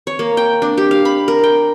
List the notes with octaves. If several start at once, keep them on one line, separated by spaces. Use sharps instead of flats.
C#5
A#3
G5
D4
G4
F5
B5
A#4
G5